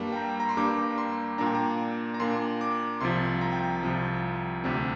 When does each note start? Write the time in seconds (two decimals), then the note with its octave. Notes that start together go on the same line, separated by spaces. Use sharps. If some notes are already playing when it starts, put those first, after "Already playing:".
Already playing: G2 G3 A#3 D4
0.12 G5
0.16 A#5
0.40 A#5
0.49 C6
0.57 G2 G3 A#3 D4 D6
0.98 C6
1.38 A#2 A#3 D4 A#5
1.46 G5
1.55 A#5
2.14 A#5
2.20 A#2 A#3 D4 C6
2.61 D6
3.01 C2 C3 F3 C6
3.41 A#5
3.52 G5
3.63 A#5
3.83 C2 C3 F3
4.64 D2 C3 G3 C4